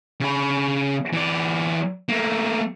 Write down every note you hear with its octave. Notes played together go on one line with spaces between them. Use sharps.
C#3 B5
E3 D5
A3 A#3